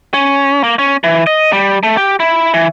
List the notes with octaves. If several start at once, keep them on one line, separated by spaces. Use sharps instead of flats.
C#4
A#3
C#4
E3
D#5
G3
A3
G4
E4
E3